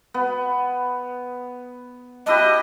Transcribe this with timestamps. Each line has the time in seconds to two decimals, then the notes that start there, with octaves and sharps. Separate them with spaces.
0.14 B3
2.26 D4 E4 G4 D#5